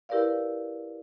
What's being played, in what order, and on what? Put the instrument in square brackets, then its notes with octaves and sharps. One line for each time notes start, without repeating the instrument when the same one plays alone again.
[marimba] E4 G4 A#4 B4 D5 F5